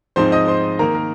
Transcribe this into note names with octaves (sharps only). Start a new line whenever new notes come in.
G#2 F3 C4 D#4 C5 C6
D#5 D#6
C5 C6
D#3 A#3 D#4 A#4 A#5
A#4